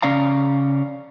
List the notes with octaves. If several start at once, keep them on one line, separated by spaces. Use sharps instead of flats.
C#3 C#4 D5 F5 A#5